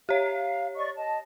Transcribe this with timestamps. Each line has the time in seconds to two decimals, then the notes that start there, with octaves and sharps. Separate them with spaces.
0.09 G4 C#5 F5
0.76 D5 D#5 C#6
0.97 D#5 A5